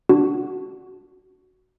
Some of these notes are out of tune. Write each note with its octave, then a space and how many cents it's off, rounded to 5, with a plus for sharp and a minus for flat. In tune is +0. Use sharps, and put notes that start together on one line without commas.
D4 -10 F#4 +5